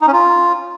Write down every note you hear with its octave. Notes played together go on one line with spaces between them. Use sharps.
D#4
C#4
F4